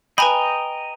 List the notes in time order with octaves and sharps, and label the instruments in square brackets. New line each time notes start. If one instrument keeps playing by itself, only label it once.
[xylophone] B4 G#5 B5 [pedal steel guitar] D#5 G5 A#5